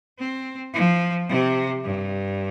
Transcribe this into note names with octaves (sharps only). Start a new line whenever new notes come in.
C4
F3
C3
G2